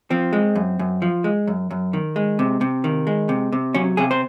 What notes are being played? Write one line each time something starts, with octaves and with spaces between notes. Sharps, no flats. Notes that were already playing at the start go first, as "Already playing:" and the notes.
F3 C4
G#3
F#2
F#2
F3
G#3
F#2
F#2
D#3
G#3
C3
C3
D#3
G#3
C3
C3
F#3 C#4
C3 G#4
C5